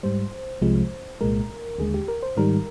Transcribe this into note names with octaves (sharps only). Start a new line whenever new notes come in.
G#2 G3 C5
C2 C3 F3 G#3
C2 A#2 G#3 A#4
D#2 D3 G#3 G#4
G4
A#4
C5
G#2 D#3 G3 A#4